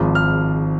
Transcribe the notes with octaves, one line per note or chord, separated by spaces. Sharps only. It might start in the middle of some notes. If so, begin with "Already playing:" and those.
Already playing: G#1 G#2 F3
F6